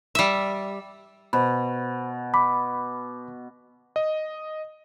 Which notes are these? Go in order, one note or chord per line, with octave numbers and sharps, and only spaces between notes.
G3 E5
B2 C5 B5
B5 D6
D#5